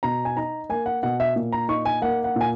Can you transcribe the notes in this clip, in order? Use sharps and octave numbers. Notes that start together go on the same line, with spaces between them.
B2 A#5
G#5
D#4 A#5
A#3 G#5
F#5
B2 F#5
E5
A#2
A#5
D#4 C#6
G#5
A#3 F#5
F#5
A#2 G#5